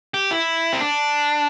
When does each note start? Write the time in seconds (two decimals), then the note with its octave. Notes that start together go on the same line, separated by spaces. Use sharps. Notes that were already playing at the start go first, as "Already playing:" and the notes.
0.14 G4
0.31 E4
0.73 C4
0.80 D4